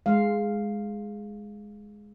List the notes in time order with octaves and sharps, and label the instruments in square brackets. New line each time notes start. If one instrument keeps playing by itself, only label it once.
[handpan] G#3 F5